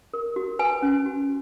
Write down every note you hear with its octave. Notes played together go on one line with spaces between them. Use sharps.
A#4
F#4
B4 G#5
C#4
F#4